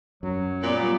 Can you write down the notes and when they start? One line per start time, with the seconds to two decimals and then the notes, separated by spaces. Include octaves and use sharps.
0.23 F#2 F#3
0.63 A#2 G3 B3 D5